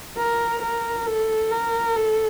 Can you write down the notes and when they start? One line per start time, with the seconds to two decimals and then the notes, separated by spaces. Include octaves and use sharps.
0.18 A#4
0.62 A#4
1.07 A4
1.51 A#4
1.96 A4